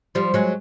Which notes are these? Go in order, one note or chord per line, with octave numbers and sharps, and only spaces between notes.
F3 G3
F#3 G#3